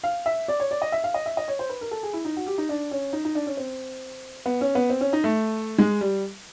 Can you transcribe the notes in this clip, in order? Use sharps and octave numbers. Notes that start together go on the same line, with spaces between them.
F5
E5
D5
C#5
D5
D#5
E5
F5
D#5
E5
D#5
C#5
C5
B4
A#4
A4
G#4
E4
D#4
F#4
G4
D#4
D4
C#4
D#4
D#4
D4
C#4
C4
B3
C#4
B3
C4
C#4
D#4
A3
G#3
G3